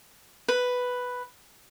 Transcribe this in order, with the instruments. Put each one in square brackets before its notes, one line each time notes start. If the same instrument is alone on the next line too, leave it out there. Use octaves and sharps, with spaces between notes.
[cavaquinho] B4